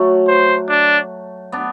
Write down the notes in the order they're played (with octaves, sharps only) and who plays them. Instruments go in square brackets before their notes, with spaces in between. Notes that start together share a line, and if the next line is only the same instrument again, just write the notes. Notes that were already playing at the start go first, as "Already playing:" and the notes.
Already playing: [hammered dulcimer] F#3 A3
[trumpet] C5
D4
[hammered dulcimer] B3 D4